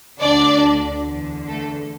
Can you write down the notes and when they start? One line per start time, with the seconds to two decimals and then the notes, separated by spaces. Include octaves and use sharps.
0.20 D2 D3 D4 D5
1.06 E2 D3
1.49 A3 A4